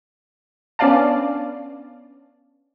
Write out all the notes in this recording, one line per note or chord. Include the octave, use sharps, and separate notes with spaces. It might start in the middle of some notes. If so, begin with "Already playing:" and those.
B3 C#4 D4 D5 F5 A5